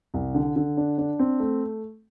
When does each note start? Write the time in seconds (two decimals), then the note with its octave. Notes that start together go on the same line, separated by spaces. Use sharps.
0.14 C2
0.34 D3
0.56 D3
0.77 D4
0.98 D4
1.19 C4
1.40 A3